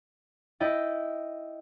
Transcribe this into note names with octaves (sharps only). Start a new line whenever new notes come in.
E4 D#5 G5 A6